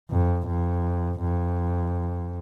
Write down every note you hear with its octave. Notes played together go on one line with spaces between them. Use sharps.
F2
F2
F2